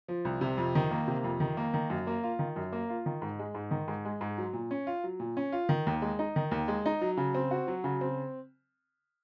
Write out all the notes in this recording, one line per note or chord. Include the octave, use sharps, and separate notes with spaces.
F3
C2
C3
F2
D#3
A#3
C3
F2
D#3
A#3
D#3
F#2
A#3
F4
D#3
F#2
A#3
F4
D#3
G#2
G#3
G#2
D#3
G#2
G#3
G#2
F#3
A#2
C#4
F4
F#3
A#2
C#4
F4
D#3
D#2
G#3
D#4
D#3
D#2
G#3
D#4
F#3
C#3
C4
F#4
F#3
C#3
C4